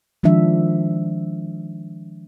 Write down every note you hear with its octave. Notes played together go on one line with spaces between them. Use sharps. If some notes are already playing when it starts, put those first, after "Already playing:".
D#3 F3 G#3 D4 E5